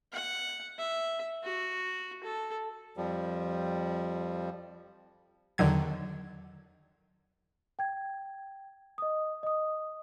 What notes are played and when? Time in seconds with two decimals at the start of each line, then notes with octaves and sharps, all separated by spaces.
0.13 F#5
0.78 E5
1.43 F#4
2.23 A4
2.97 F2 F3 G3
5.58 E2 D3 D#3 F#3 G#6
7.79 G5 G#6
8.98 D#5 D#6
9.43 D#5 D#6